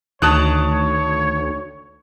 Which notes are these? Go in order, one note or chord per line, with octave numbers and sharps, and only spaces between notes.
D2 D#3 C#5 A5 D#6 F#6